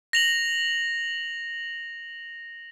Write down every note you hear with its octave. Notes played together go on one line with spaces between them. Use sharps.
A#6 F7 F#7